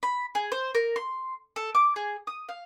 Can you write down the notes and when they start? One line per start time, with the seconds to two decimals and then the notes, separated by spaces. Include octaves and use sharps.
0.03 B5
0.35 G#4
0.52 C5
0.75 A#4
0.96 C6
1.56 A4
1.75 D6
1.96 G#4
2.27 D#6
2.49 F5